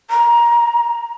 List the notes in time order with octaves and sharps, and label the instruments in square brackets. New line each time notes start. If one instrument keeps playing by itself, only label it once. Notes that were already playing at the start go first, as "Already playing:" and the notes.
[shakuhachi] A#5